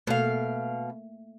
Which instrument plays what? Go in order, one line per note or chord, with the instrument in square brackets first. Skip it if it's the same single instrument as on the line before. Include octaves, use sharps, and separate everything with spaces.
[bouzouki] B2 F5 [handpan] A3 A#3